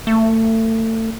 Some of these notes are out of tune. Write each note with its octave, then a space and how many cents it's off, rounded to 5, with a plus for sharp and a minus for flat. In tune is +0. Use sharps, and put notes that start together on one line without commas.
A3 +30